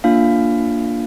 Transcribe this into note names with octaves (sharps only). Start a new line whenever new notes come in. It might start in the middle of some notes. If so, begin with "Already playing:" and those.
A#3 D4 F4 F5